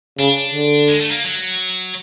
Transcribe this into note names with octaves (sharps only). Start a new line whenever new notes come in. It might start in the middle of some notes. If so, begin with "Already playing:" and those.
C#3 D4
D3
G#3
A3
A#3
F#3